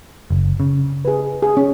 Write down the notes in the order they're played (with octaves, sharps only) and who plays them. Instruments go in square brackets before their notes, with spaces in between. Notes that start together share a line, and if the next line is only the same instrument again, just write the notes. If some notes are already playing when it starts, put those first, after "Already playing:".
[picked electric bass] F#1
C#3
[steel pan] G#4 B4
G#4
C#4